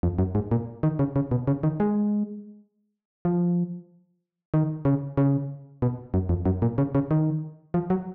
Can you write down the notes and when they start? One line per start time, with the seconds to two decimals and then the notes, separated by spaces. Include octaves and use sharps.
0.03 F2
0.19 F#2
0.35 G#2
0.51 A#2
0.83 D#3
0.99 C#3
1.16 C#3
1.31 B2
1.47 C#3
1.63 D#3
1.80 G#3
3.25 F3
4.54 D#3
4.85 C#3
5.17 C#3
5.82 B2
6.14 F#2
6.29 F2
6.46 F#2
6.62 A#2
6.78 C#3
6.95 C#3
7.11 D#3
7.74 F3
7.90 F#3